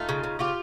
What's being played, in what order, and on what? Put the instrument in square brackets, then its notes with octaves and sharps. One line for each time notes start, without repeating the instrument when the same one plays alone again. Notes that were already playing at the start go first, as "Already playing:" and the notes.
Already playing: [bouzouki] A3 D#4 F4
C#3
C#3
C#3 F4 G4